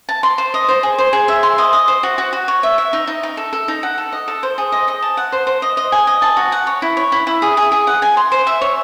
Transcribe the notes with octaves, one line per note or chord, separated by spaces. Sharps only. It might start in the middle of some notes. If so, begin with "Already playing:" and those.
A5
C6
C5
D#5
C5
G#4
C5
G#4
E5
C6
D#5
D#5
C5
F#4
F#4
F#4
C#5
E5
E5
D#4
D#4
D#4
A4
A4
D#4
F#5
A4
D#5
A4
C5
G#4
D#5
D#5
A5
F#5
C5
C5
D#5
D#5
G#5
D#5
A5
F#4
F#5
C#5
E4
C#5
E4
E4
G#4
G#4
G#4
F#5
G#5
C6
C5
E5
C#5